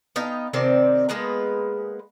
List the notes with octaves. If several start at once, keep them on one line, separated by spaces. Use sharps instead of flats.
B3 D#4 F5 G5
C3 D#3 C4 D5
G#3 A#3 B3 B4